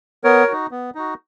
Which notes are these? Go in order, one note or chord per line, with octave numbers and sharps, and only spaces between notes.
B3 A#4 C#5
D#4 F#4
B3
D#4 F#4